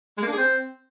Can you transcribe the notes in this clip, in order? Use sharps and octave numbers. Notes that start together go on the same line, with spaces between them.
G#3
A#3
D4
G#4
C4